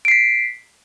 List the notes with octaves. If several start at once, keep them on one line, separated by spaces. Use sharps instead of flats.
B6 C7 D7